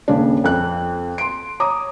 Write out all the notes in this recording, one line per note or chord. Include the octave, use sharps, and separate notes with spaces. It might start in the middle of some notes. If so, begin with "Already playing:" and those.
D#1 C#3 C#4 D4
F2 F#6
C6 D7
C#5 A#5 D6 D#6